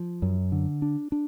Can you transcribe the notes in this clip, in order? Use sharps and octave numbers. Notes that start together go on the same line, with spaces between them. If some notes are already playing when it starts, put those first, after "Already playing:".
Already playing: F3
F#2
D3
D4
D4